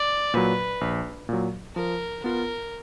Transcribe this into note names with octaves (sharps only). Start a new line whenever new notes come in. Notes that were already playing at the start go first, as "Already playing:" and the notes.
Already playing: D5
A#2 F#3 B4
A#1
A#2 F#3
F3 A#4
B3 F4 A#4